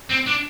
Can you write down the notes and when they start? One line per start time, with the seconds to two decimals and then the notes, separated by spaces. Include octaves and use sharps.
0.10 C4
0.26 D4